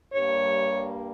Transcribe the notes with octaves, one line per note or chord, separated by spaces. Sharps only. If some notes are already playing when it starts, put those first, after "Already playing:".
G2 G3 A#3 C#5